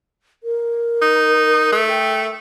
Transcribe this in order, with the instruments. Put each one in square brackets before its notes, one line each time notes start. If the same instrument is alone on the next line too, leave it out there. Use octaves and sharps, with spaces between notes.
[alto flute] A#4
[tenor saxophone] D#4
A3
[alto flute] G5